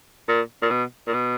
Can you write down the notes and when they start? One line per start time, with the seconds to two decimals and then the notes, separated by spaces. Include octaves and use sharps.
0.28 A#2
0.62 A#2
0.71 B2
1.07 A#2
1.13 B2